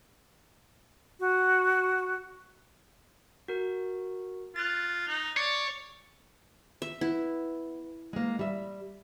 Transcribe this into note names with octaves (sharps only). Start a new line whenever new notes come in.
F#4
F#4 A#4
F4 F#6 A6
D#4
C#5 D5
E5
B3 E4
G#3 A#3
G3 E5